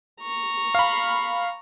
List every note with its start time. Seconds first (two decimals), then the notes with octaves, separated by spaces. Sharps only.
0.21 A#5 C#6
0.75 F5 B5